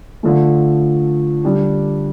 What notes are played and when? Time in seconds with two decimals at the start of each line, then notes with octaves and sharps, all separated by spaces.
0.23 D3 F3 A3
1.44 D3 G3 D4 G4